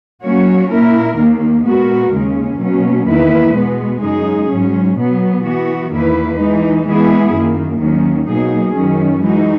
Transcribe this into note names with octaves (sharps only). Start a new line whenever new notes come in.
F#3 A#3 C#4 F#4 C#5
A#2 A#3 E4 A#4
D#2 D#3 A#3
A#2 G#3 B3 F#4 A#4
D#2 C#3 G#3 C#4
B2 F#3 A#3 C#4
E2 D#3 A#3 E4 B4
B2 G#3 B3
F#2 C#3 G#3 D#4 G#4
G#2 F#3 C#4
B2 F#3 B3
E3 B3 F#4
E2 D#3 A#3 E4 B4
E3 G#3 D#4
E3 G#3 B3 E4 G#4
F#2 D#3 A#3
D#2 D#3 F#3 C#4
B2 F#3 A#3 D#4 G#4
F#2 D#3 F#3 C#4
E3 G#3 D#4 F#4